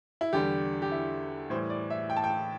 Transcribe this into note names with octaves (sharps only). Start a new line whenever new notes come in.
E4
E2 D3 G3 G4
G4
E4
A2 E3 G3 C5
D5
E5
G5
A5
G5